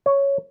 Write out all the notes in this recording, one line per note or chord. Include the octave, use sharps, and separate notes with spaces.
C#5